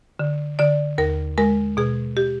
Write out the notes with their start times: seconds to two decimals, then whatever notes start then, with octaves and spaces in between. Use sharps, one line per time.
0.19 D3
0.59 D3 D5
0.98 D#2 A#4
1.38 G#3 A#4
1.77 B2 G#4
2.17 G4